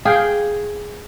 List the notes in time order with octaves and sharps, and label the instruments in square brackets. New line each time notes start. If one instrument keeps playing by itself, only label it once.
[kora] G#4 [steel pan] F5 G5